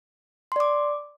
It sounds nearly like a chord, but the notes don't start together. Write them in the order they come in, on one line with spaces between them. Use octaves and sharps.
C6 D5 D6